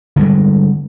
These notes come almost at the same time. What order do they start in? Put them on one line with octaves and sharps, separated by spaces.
D3 G3 G#3